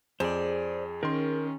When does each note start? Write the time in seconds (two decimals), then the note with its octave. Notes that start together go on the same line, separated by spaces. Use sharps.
0.20 F2 G#4 C5 D5
1.03 D#3 C#4 A#4 C6